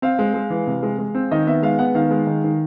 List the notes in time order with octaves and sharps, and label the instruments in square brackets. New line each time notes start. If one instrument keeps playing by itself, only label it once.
[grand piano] C4 F5
G#3
G#3
E3
C3
G#3
G#3
C4
D#3 D#5
B3 E5
G#3 F5
B3 F#5
D#3 F5
G#3
D#3
D#3